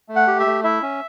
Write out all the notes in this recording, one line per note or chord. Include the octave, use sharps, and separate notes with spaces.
A3
F#5
G4
E5
A3
E4 E5
C#4